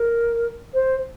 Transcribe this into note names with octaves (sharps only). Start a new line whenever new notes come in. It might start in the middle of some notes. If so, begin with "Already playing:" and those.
Already playing: A#4
C5